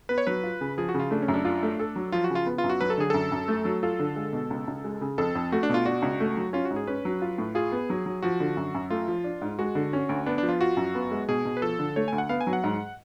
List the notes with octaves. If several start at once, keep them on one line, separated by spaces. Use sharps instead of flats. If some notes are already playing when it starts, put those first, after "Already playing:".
B3 B4
C#5
F#3 B4
F4
C#3
F3 G#4
F#4
C#3
F4
A3 D4
C#4
F#2
D4
D4 F4
A3
A4
F#3
F3 F4
F#4
C#3
F4
B3
F4
F#2
F#4
F#3 B4
A4
D3 G#4
F#2 A4
F#2
A3
F#3
F4 A4
D3
G#3
B2
C#2
C#2
G#3
C#3
F2 A4
F2
A3 F#4
D4
B2 F4
D4 F#4
C#2
A3
F#3
C#4 F4
F#4
G#2
G#4
C#4 B4
F#3
F4
A2
F4 G#4
B3
F#3
F#3
F3 F#4
D3
F#2
F#2
A3 F4
F3
D4
G#2
G#3 F#4
D3
C#4
D2
B3 D4
F3 D4
F4
F4 F#4
F#2
B3
G#3
B2 G#4
B2
B4
F3 A4
D3
A3 C#5
D2 G#5
F#5
B3 F5
G#5
F#3
F#5
G#2